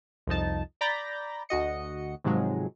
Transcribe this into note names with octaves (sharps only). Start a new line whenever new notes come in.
C2 F2 F3 D#4 A5
D5 A#5 B5 G6 A6 A#6
D2 F#4 D#5 C#7
G#2 C3 D#3 F3 F#3 G#3